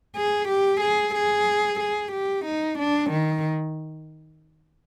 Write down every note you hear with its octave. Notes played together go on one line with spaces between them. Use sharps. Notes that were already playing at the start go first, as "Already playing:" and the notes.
G#4
G4
G#4
G#4
G#4
G4
D#4
D4
D#3